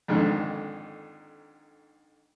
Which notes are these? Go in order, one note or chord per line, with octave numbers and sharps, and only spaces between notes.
F2 G#2 D3 D#3